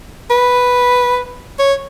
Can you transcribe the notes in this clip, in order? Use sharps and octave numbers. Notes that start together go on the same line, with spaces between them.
B4
C#5